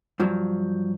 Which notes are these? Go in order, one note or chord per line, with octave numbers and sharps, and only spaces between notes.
G2 F3 F#3